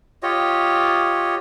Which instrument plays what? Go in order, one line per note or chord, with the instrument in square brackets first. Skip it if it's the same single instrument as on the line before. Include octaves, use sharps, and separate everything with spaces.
[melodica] F4 G4 C#5 D#5